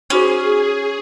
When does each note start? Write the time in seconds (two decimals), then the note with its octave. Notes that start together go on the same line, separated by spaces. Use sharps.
0.10 C#4 D#4 F#4 G#4 C5